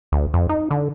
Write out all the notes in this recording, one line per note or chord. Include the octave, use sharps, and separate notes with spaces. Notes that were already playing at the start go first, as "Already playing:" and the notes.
D2
F2
D#4
D3